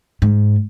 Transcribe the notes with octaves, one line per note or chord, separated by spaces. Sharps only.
G#2